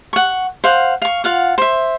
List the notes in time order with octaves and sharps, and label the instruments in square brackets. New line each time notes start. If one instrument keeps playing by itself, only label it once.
[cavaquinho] F#5 C#6
C5 F5 F#5
F5 C#6
F4 F5 F#5
C5 E5